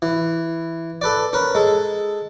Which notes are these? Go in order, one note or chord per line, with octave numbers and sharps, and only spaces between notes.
E3
A4 B4 D5
C#4 A#4 B4
G#3 A4